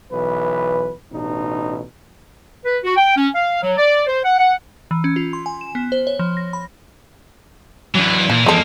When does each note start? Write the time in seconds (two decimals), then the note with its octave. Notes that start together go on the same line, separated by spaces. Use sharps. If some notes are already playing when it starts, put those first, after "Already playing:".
0.12 B1 E3 B4
1.12 A1 B2 D4 D#4
2.64 B4
2.84 F#4
2.96 G5
3.16 C#4
3.35 F5
3.62 F#3
3.77 D5
4.07 C5
4.24 F#5
4.39 F#5
4.91 E3
5.04 C#4
5.16 F4
5.33 C6
5.46 G#5
5.61 E7
5.75 B3
5.92 C5
6.07 C#5
6.19 F3
6.37 A#6
6.53 B5
7.95 E3 F#3 D4
8.30 A#2 F3
8.46 E2 E3 F3 G#3 A#3 A4